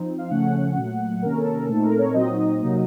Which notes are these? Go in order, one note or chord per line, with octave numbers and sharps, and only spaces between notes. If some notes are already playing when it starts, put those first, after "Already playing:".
Already playing: F3 C4 D#4
F5
C#3 F3 A3 C#4 F#5
A#2 F#3 A3
C3 D#3 A#3 C#4 A#4
A4
A#4
A#2 A3 C4 D#4 A4
A#4
C#5
A#2 F#3 C4 D#4 D#5
C3 F#3 A#3 D#4